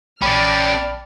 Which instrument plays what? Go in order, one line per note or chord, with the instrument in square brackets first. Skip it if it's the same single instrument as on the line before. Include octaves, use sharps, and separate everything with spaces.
[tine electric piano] A#1 G5 B5 [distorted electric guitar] C#4 G4 [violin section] D5 A5 F6